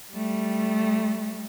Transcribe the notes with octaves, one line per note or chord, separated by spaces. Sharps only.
G3 A3